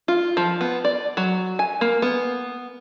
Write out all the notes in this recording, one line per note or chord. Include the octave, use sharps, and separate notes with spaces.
F4
F3
B3
D5
F#3
G#5
A#3
B3